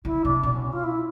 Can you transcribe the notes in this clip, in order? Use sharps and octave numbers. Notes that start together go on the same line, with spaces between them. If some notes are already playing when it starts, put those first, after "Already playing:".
D3 E4
C3 D4
B2 D4
C#4
C#4
F4
E4